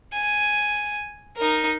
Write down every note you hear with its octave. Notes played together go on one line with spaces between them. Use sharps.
G#5
D#4 A#4